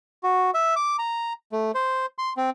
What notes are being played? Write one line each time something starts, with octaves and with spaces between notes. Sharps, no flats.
F#4
E5
D6
A#5
A3
C5
C6
C4